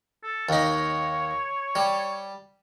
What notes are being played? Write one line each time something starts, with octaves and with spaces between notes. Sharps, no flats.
A4
D#2 D#4 C#5
G3